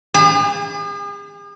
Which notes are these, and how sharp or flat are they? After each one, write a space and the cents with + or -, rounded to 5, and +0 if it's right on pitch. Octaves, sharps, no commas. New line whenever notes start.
G#4 -45